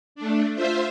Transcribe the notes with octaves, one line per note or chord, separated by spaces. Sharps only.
A3 D4
F4 C5 E5